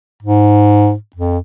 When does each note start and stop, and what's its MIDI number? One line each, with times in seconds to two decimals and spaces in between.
0.23 0.93 44
1.16 1.38 41